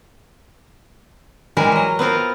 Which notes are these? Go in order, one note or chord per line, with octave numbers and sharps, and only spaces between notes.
E3 G3 G#3 A#4
F#3 D#5
B3 C4 F4 A#4